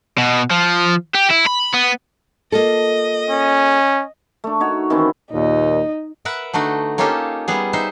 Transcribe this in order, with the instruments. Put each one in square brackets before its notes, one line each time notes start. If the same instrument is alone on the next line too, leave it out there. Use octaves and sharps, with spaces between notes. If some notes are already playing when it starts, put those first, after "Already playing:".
[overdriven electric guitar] B2
F3
G4
E4
B5
B3
[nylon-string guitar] A#3 F4 A4 [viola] D#5
[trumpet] C#4
[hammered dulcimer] A3 D4
D#4 F#4 C#5
D#3 E3 C4 C#4
[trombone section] D#2 A#2 [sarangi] D#4
[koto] A#4 B4 E5 F#5
D3 A3 D#4 F#4
A#3 C#4 D#4 F4 G4 A4
G3 B3 G#4
D#4 C5 E5